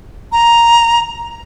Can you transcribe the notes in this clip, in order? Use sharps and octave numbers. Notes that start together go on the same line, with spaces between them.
A#5